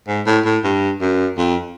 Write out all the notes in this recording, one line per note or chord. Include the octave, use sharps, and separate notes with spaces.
G#2
A2
A2
G2
F#2
F2